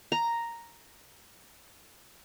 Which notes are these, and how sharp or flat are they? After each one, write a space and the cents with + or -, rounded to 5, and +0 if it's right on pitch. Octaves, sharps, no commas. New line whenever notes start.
A#5 +0